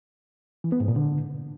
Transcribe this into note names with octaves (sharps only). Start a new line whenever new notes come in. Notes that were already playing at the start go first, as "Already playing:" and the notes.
E3
B3
G#2
A#2
D3